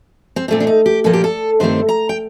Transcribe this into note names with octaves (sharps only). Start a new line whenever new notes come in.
C4
A#2 A3 C4 D4
D4
D#4
G4
A#2 F3 A#3 A4
G4
A4
G2 D#3 A3 C4 C5
A#5
G5